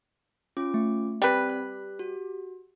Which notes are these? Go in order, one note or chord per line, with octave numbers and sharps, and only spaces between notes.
C#4 F4 D6
A3
G3 C4 G4 B4 D5
F#6
F#4